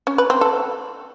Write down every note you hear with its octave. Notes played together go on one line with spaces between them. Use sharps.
C#4
B4
C4
A4